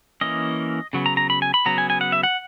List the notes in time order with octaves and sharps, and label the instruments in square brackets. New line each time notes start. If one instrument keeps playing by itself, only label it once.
[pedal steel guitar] E3 A#3 C#4 D#5
C#3 F#3 B3
A#5
A#5
B5
G#5
B5
C#3 F#3 B3 A#5
G#5
G#5
F#5
E5
F#5